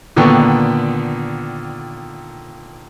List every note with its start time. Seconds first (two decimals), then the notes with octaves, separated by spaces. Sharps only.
0.16 A#2 D3 D#3 B3 G5 C#6